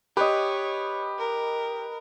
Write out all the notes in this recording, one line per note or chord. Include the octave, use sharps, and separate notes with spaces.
G4 B4 C#5 D#5
A#4